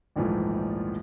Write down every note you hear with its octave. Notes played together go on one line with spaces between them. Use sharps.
A#1 D#2 G#2 E3 F3 A3